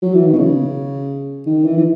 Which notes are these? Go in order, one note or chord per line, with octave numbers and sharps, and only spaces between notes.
F#3
E3
D#3
B2
C#3
D#3
E3
E3